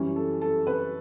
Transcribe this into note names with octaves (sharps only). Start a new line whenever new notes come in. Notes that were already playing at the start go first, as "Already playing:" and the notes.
Already playing: F#2 E3 G3 C#4
A4
A4
B4